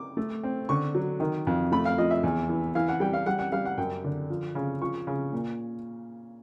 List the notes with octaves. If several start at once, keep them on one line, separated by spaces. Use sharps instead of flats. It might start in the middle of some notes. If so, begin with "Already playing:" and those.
Already playing: D6
A3
C4
D3 C#6
F#3
D#3
F2
A3 B5
F5
F3 D#5
E5
E2
E3
E3 F5
F#5
G3 G5
F5
G3 F#5
F#5
G3 F5
F#5
F#2 G5
D3
F3
C#3
F3 C#6
C#3
A#2